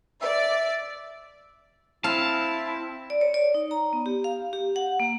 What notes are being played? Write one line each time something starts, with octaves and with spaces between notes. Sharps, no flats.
D5 E5
C4 E4 F5 A5
D5
C#5
D5
D#4
A#5
B3
G4
F5
G4
F#5
A#3